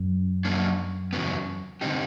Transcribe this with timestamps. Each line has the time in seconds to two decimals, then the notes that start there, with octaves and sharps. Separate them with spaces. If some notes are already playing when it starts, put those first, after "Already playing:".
Already playing: F#2
0.45 F#3 A#3 D4
1.13 E2 C#3 F#3 B3
1.81 D3 G3 C4 D#4 G4